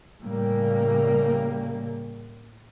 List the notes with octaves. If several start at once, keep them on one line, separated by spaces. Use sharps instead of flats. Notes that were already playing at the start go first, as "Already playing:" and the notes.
A2 C#3 G3 A#3